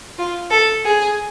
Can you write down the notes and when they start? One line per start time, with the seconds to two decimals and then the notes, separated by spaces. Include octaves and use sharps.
0.18 F4
0.50 A4
0.84 G#4